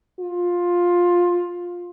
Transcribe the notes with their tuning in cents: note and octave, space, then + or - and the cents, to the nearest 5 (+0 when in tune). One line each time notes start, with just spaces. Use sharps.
F4 +10